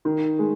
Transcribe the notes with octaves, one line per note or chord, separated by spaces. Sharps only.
D#3
G#3